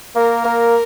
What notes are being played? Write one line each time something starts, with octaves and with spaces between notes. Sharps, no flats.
A#3 A#4
A#3